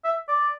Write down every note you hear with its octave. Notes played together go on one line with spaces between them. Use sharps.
E5
D5